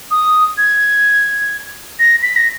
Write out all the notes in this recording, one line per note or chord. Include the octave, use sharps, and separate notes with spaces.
D#6
G#6
A#6
B6
A#6